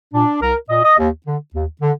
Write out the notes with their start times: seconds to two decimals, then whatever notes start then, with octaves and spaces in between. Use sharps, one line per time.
0.14 A#2 D4
0.42 C2 A#4
0.70 A#2 D#5
0.84 D#5
0.98 D#2
1.27 D3
1.54 D#2
1.82 D3